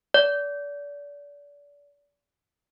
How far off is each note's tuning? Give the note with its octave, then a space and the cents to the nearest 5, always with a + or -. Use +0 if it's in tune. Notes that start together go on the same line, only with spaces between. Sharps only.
D5 -35